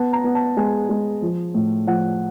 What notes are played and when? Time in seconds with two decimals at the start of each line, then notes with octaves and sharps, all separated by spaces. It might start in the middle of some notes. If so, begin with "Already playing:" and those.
Already playing: B3 A5
0.13 A#5
0.24 B3
0.35 A5
0.57 G#3 G#5
0.89 G#3
1.22 F3
1.54 A2
1.87 F3 F#5